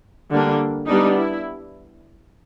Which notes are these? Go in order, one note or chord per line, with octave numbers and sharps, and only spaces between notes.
D3 G3 A#3 D4
G3 B3 D4 D#4
E4